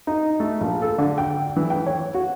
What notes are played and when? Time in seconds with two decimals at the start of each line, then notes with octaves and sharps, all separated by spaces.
0.07 D#4
0.40 A3
0.61 A#1
0.82 A4
0.98 D3
1.18 G5
1.56 E3
1.70 G5
1.86 C#5
2.14 F#4